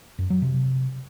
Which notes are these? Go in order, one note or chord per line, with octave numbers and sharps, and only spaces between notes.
F#2
F#3
C3